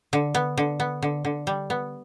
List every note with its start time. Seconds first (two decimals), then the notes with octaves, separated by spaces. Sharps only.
0.13 D3
0.35 B3
0.57 D3
0.80 B3
1.02 D3
1.25 D3
1.47 G3
1.70 B3